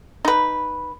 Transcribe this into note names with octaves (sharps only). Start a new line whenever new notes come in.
D#4 B4